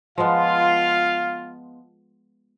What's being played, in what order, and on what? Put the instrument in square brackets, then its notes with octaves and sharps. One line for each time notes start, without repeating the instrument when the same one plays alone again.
[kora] F3 G#3 B3 [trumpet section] F4 F5